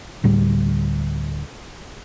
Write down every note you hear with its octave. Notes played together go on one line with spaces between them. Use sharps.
D2 A2 G3